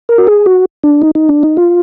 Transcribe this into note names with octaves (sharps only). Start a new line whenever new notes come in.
A#4
F#4
G#4
F#4
D4
D#4
D#4
D4
D#4
F4